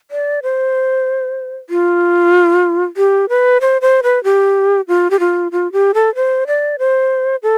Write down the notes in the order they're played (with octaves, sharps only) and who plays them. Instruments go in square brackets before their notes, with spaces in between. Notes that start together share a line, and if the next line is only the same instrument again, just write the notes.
[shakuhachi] D5
C5
F4
G4
B4
C5
C5
B4
G4
F4
G4
F4
F4
G4
A4
C5
D5
C5
A4